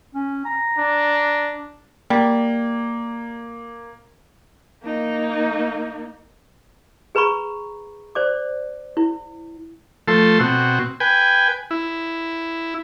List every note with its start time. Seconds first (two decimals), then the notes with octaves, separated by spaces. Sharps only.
0.14 C#4
0.45 A#5
0.79 D4
2.10 G3 A#3
4.85 A#3 D#4
7.15 G#4 B4 A#5 B5 C#6
8.15 C5 D5 D6
8.97 E4
10.08 F3 A3 A4 C6
10.40 B2 C4 F#4
11.00 B4 G5 G#5
11.71 E4